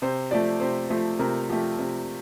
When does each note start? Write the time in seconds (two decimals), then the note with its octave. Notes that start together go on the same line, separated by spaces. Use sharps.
0.02 C3 C5
0.31 F3 A3 D5
0.60 C3 C5
0.90 F3 A3 C5
1.19 C3 A#4
1.49 F3 A3 G4
1.79 C3